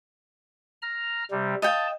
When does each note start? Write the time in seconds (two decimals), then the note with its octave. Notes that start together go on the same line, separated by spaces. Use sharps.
0.82 A#5 F6
1.31 C3 G3
1.62 D#5 F5 G5 A5